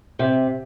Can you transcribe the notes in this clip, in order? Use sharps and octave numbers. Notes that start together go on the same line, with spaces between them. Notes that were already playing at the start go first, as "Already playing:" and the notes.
C3